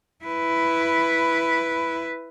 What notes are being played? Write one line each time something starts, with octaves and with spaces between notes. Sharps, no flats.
E4 B4